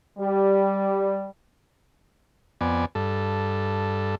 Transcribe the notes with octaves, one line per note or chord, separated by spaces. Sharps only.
G3
F2 B3 D5 G#5
G2 A4